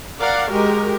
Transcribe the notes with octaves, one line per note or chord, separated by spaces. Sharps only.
A#4 D5 F5 F#5
G#3 F#4 G4 A#4